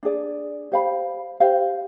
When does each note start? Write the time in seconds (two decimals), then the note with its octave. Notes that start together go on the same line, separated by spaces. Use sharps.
0.03 D4 G#4 D5
0.72 G4 C5 F5 B5
1.40 G4 C5 F5